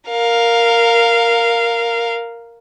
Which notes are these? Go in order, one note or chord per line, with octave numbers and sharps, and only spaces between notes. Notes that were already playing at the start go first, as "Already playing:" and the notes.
A#4 F5